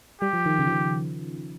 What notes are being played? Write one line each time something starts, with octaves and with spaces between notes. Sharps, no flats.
G3 G4
F3
D#3
C#3
F3
D#3